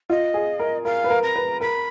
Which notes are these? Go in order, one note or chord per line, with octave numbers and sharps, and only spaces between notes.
F4 D#5
G#4
A#4
A#4 F5
B4
A#4
A#5
B4
A#4 B5